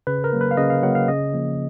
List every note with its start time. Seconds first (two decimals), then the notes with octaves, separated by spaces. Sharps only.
0.07 C#3 B4
0.24 A#4
0.33 F#3 A#3
0.41 B4
0.51 F5
0.57 C#3 D#5
0.70 F5
0.82 F#3 A#3 F#5
0.95 F5
1.08 C#3 D#5
1.34 F3 A#3